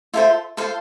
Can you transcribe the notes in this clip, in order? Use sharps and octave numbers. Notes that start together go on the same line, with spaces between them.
F4 A4 C5 E5
F4 A4 C5 F5